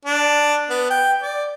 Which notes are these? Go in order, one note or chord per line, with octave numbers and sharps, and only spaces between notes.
D4
B3
G5
D5